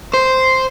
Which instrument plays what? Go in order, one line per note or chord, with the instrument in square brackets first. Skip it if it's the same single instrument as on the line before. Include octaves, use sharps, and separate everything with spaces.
[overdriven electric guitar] C5